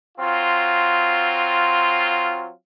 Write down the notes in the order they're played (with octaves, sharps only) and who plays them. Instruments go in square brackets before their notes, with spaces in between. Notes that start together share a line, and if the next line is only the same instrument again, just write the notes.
[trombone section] F#3 C4 F4